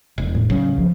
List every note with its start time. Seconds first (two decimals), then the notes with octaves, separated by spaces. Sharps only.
0.18 E1
0.35 A2
0.50 C#3 F#3
0.78 F3